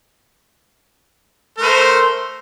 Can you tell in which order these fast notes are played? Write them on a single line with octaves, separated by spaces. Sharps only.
A#4 A3 C5